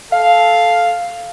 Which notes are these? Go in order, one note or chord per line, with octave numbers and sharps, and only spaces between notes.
A4 F5